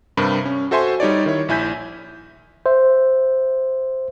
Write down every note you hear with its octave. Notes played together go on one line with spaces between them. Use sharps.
G2 C3 A#4 B5
C#4
F#4 A4 C5 E5 G#5 C6
G3 D#4 C#5 D5
D#3 E4 C#5
A#1 E4 G#5 G6 B6
C5 E5